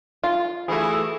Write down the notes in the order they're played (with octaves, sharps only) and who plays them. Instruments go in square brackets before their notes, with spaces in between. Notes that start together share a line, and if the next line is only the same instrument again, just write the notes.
[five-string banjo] F4
[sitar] E3 E4 F#4 [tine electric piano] A3 G#4